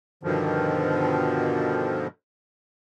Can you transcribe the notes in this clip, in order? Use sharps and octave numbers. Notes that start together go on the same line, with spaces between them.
G2 B2 D3 D#3 F3